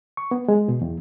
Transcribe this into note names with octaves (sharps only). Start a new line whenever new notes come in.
C#6
B3
G#3
B2
E2